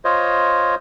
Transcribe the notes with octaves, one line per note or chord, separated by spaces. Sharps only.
F4 C5 C#5 D#5